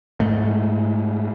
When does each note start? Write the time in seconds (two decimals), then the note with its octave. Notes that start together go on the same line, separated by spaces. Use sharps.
0.20 G#2 G#3 A3